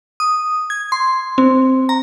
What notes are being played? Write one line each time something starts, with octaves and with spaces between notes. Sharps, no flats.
D#6
G#6
C6
C4
A#5